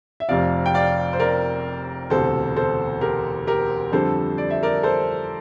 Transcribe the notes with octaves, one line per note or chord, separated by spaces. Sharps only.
E5
F1 F2 C3 D5 F5
G5
D5 F5
C5
A#4 D5
E1 D2 C3 A4 C5
A4 C5
G4 A#4
G4 A#4
F2 D3 G3 A4 C5
D5
E5
A#4 D5
A4 C5